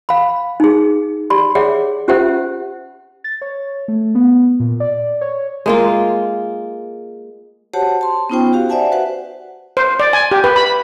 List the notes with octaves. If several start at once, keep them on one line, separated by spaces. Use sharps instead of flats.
F5 B5
D#4 G#4
G4 D5 B5 C6
G#4 C#5 D5 E5 F#5
C#4 F4 G4 C5 E5 F#5
A6
C#5
A3
B3
A#2
D5
C#5
G#3 A#3 F4
F#4 G4 C5 C#5 F#5 A5
A5 C6
B3 C#4 D#4 F4 C5 G5
F#4 G4 F5
C5 D5 E5 F#5 G#5 A5
F#4 B4 C5 F#5
C5
D5
G#5
G4
B4
B5